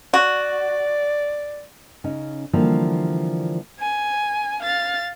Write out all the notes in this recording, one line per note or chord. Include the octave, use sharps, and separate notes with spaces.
F#4 D5
C#3 C#4 D#4
D3 E3 F3 G3 A#3
G#5
F5 A6